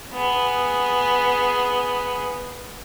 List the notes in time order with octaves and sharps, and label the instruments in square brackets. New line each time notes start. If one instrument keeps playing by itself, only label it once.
[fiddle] B3 G#4